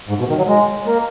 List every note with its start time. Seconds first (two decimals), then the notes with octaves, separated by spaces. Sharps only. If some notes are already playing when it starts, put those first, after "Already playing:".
0.09 G#2
0.19 B2
0.29 D#3
0.38 F#3
0.48 G#3
0.86 A#3